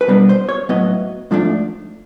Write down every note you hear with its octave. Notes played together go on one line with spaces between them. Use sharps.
B4
B2 G3 B3 D4 A#4
C5
C#5
A2 F#3 B3 D#5
G#2 F3 A3 D4